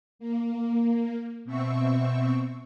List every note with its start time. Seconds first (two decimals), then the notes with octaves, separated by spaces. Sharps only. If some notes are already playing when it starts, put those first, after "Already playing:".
0.19 A#3
1.45 B2 C4 E5 C#6